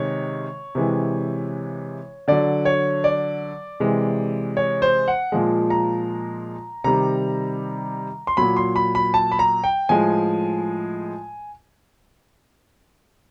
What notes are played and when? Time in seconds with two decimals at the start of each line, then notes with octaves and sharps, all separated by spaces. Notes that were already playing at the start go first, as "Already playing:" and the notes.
Already playing: C3 D#3 G#3 C#5
0.75 C3 E3 G#3
2.28 D3 F#3 D5
2.65 C#5
3.04 D5
3.80 C3 E3 G#3
4.57 C#5
4.82 C5
5.08 F#5
5.32 A#2 F3 G#3
5.70 A#5
6.84 C3 D#3 G3 A#5
8.27 C6
8.37 A#2 F#3 B5
8.57 C6
8.76 B5
8.95 B5
9.14 A5
9.32 B5
9.39 A#5
9.64 G5
9.89 A2 F3 G#3 G#5